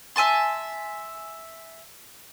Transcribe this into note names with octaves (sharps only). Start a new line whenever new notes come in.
E5 G#5 A5 C6